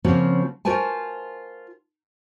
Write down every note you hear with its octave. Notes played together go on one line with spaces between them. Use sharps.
C#3 F3 A#3 C4 C#4 F#4
F4 F#4 A#4 C5 G#5 A5